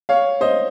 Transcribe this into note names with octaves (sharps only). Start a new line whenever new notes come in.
C#5 F5
C5 D#5